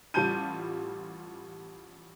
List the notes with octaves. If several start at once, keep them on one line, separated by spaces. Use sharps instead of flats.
A1 G3 F4 A5 G6 D#7